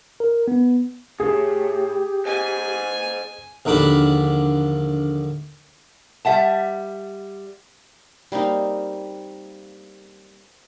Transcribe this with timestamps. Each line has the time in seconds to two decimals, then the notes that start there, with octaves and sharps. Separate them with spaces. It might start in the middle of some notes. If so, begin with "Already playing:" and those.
0.20 A#4
0.48 B3
1.20 A2 G4 G#4
2.25 C5 D#5 G#5
3.65 A#1 D#2 D3 D4 B5
6.25 G3 E5 F#5 A5
8.32 G3 A#3 C4 D#4